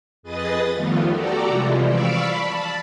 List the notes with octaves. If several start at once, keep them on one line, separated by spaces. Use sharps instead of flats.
F2 G#4 B4 D#5 D#6 A6
D#3 F3 G3 A3 B3 F4
F#4 G4 A4 D5 A#5
C3 E3 F3 G3 G#3
D5 F5 B5 C#6 D6 E6
A5 B5